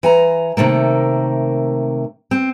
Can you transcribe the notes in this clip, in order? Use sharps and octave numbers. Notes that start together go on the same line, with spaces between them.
E3 G#5 A#5
C3 D#3 A3 A#3
C4